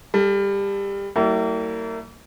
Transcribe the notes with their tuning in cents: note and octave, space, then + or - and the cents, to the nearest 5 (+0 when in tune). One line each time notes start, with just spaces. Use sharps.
G3 +25 A4 +0
G3 -45 A#3 -35 E4 -20